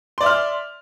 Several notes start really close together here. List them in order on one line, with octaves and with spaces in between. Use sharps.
C6 D5 E5 F6